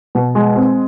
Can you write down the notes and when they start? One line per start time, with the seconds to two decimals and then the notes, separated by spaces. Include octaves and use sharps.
0.15 B2
0.35 G#3
0.56 C4